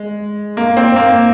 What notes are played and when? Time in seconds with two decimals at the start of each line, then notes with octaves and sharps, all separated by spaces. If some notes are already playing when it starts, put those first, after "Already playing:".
Already playing: G#3
0.57 A#3
0.77 C4
0.96 A#3